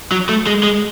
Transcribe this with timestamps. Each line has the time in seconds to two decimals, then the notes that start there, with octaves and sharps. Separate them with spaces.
0.12 F#3
0.29 A3
0.47 G#3
0.63 G#3